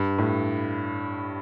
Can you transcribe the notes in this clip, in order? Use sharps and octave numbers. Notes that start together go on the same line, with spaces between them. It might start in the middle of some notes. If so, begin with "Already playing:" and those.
Already playing: G2
A2